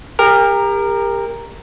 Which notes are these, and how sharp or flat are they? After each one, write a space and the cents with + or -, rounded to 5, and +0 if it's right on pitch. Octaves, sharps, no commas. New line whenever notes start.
G4 +35 A#4 +0